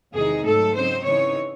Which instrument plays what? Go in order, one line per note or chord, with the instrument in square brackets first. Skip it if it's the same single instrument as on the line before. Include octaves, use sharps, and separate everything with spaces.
[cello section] E2 C3 D#3 G#3 D#4 G#4
G#2 F#3 A3 A4
C#3 F#3 C4 D#4 C5
C#3 E3 C4 D#4 C#5